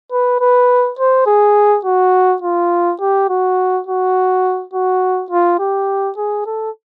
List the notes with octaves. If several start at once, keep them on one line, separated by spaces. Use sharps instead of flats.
B4
B4
C5
G#4
F#4
F4
G4
F#4
F#4
F#4
F4
G4
G#4
A4